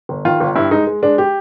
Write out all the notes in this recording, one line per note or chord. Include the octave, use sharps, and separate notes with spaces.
G1
D#3 F4
G1
G2 E4
G#3 D#4
G#3
G#3 D4
G4